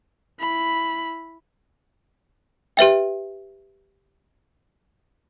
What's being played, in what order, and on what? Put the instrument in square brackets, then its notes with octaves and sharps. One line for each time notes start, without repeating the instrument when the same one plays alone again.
[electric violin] E4 B5
[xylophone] G4 B4 E5 G5